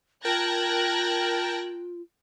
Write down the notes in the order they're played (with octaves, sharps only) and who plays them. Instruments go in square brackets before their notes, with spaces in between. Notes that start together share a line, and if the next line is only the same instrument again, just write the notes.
[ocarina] F4 [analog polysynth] A#4 G5 A5 [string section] F#6 G#6 A#6